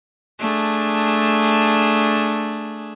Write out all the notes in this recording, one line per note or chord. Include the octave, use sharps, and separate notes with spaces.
A3 D4 G#4